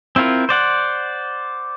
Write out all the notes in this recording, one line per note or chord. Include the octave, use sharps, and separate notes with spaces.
C4 E4 F4 A#4
C5 D5 F#5